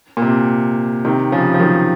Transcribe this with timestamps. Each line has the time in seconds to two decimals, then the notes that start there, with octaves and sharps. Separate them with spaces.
0.17 A#2
0.22 C3
1.05 C3 D#3
1.32 C#3 F3
1.54 F3
1.59 D#3 F#3